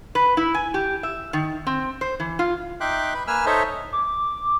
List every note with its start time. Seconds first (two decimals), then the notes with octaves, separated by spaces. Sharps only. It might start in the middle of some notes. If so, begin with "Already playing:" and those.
0.15 B4
0.37 E4
0.54 G#5
0.74 G4
1.03 E5
1.33 D#3
1.67 C4
2.01 C5
2.20 E3
2.39 F4
2.80 D#4 E5 G5 C6 D6 F#6
3.14 B4 B5
3.27 A#3 B4 G#5 E6 F6
3.46 D#4 A4 C5 C#5 D#5 E5
3.93 D6